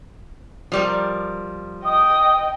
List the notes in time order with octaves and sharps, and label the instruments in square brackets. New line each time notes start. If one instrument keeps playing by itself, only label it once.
[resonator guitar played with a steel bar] F3 G3 A#4
[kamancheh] D#5 G5 [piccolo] D#6